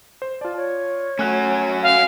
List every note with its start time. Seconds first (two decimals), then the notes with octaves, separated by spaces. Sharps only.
0.22 C5
0.41 F4 D5 A5
0.56 C#5
1.19 F#3 A3 C#4 F#6
1.83 F5